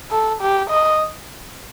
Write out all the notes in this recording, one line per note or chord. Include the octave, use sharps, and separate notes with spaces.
A4
G4
D#5